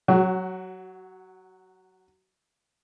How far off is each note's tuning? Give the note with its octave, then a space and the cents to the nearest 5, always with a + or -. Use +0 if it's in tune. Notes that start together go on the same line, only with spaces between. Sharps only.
F#3 +0 F#4 +25